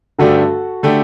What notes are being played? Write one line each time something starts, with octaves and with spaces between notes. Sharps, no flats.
G2 D3 A3 D4 F#4 G4 A4
D3 A3 D4 G4